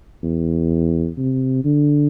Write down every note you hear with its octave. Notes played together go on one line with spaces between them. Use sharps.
E2
C3
D3